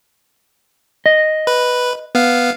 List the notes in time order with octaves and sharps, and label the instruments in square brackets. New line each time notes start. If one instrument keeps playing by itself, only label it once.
[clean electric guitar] D#5
[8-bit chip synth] B4
B3 F5